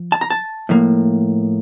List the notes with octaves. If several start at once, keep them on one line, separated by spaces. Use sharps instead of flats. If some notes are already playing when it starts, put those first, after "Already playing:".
Already playing: F3
A5
A#5
A5
A2 F3 A#3